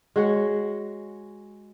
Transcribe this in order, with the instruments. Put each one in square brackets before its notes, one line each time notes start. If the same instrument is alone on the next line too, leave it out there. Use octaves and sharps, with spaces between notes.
[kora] G#3 F#4 C#5